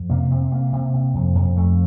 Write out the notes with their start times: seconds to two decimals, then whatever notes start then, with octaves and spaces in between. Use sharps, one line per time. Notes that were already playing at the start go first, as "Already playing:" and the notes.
Already playing: F2
0.10 C3 A#3
0.31 C3 C4
0.51 C3 A#3
0.73 C3
0.94 C3
1.14 F2
1.35 F2
1.56 F2 A3